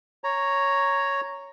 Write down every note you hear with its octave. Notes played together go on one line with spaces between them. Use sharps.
C#5 A#5